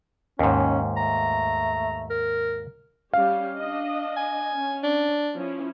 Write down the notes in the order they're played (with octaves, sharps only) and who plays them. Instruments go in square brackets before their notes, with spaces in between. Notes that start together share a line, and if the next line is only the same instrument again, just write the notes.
[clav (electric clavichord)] D#2 G#2 [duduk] C#4
[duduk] A3 [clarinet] A#5
[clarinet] A#4
[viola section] G3 C#4 G4 [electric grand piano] F5
[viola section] D4 D#5
[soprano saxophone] G#5
[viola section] C#4
[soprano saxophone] D4
[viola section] F3 C#4 E4